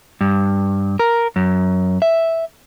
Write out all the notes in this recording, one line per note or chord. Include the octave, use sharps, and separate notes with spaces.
G2
A#4
F#2
E5